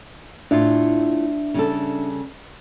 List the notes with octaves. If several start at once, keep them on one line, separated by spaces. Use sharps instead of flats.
A2 D4 F4 E5
C#3 G3 A4